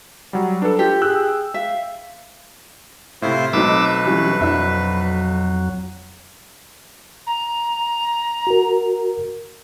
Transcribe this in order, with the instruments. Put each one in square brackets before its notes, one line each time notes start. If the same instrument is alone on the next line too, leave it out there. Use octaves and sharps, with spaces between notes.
[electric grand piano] F#3 G3 [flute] F#5
[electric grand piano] D4 A4 [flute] B4
[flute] F4 [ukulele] G4
[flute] G#4 [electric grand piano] G5 E6 F#6
[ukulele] E5 [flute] F5
[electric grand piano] A2 C3 [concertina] E4 F4 C5
[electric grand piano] B1 C4 [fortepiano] F#3 A3 D#4 [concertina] B4 [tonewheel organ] D6 E6
[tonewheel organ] E3 C#4 [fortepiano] G3 F4
[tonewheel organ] F2 F#3 [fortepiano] D4 E5
[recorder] A#5
[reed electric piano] F#4 A#4